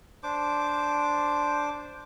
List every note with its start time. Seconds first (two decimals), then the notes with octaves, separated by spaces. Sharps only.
0.23 D4 C5 D6